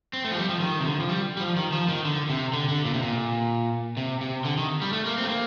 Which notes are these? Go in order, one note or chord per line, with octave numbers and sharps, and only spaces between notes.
C4
A3
F3
G3
F3
D#3
C3
D3
F3
G3
G3
F3
D#3
F3
D#3
D3
C3
D3
D3
A#2
C3
A#2
C3
C3
D3
D#3
G3
A3
A#3
C4
A3
A#3